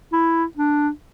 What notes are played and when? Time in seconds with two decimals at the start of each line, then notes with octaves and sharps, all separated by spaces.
0.12 E4
0.57 D4